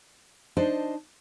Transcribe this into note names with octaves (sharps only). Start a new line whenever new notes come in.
D4 D#4 C5 D#5 A5